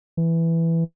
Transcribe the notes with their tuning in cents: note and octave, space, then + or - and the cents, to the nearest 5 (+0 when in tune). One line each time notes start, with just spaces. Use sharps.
E3 +5